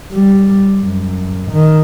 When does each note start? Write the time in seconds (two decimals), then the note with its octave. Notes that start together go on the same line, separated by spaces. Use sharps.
0.13 G3
0.81 F#2
1.52 D#3